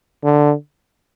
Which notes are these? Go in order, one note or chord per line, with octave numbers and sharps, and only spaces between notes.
D3